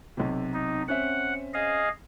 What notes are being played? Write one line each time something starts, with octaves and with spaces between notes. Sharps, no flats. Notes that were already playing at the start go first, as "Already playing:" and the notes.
B1 C3
D#4
C4 C#4 E5 F#5
G#4 D#5 F5